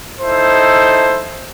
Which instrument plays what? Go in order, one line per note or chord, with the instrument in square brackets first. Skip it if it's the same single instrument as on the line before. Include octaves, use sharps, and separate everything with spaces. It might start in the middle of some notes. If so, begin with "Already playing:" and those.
[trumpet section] D#4 E4 A4 C5